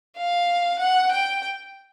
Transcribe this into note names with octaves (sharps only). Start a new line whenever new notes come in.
F5
F#5
G5